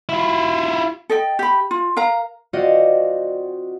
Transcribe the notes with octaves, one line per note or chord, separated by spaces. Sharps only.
E4 F4
A4 D#5 G5
G4 B5
F4
A#4 F5 A#5
C4 F4 F#4 D5 D#5 F#5